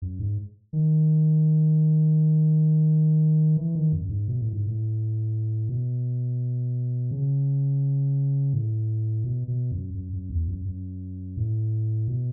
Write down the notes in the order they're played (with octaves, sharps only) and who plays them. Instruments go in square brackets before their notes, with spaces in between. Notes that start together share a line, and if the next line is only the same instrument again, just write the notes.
[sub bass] F#2
G#2
D#3
E3
D#3
F#2
F#2
G#2
B2
A2
G#2
A2
B2
C#3
A2
B2
B2
F#2
F#2
F#2
E2
F#2
F#2
A2
B2